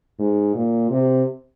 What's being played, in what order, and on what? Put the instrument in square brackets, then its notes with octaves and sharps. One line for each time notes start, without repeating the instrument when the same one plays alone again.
[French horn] G#2
A#2
C3